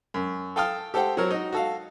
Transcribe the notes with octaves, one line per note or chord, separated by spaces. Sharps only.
F#2
A4 F5 G5 A5 D#6 F6
G4 A4 C5 F#5 G5
F#3 C4 A#4 C#5
D#4 F#4
F#4 A4 F5